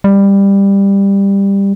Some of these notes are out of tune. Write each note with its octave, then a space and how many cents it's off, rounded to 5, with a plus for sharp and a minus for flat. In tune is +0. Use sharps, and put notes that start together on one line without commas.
G3 +15